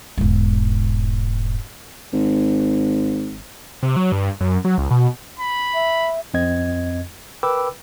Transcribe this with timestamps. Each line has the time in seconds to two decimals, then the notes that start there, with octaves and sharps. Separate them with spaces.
0.18 E1 G#2
2.13 G#1
3.83 C3
3.96 F#3
4.12 G2
4.40 F#2
4.65 F#3
4.78 C#2
4.91 B2
5.40 B5
5.74 E5
6.34 F2 C4 D#5 G#6
7.43 A#4 B4 G5 B5 D6 E6